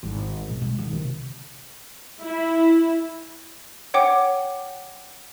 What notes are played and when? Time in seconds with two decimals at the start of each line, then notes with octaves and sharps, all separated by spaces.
0.03 G#1
0.48 B2
0.61 G#3
0.79 D#3
0.93 C3
2.22 E4
3.94 C#5 F#5 G5 D6